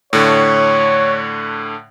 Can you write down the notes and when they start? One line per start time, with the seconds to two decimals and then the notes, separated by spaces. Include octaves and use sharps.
0.13 A2 D3 C#5